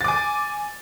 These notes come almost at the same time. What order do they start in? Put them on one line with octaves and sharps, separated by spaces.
A6 D6 G#5